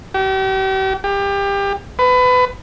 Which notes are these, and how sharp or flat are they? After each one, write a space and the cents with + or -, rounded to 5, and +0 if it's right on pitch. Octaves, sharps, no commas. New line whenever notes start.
G4 -40
G4 +25
B4 +25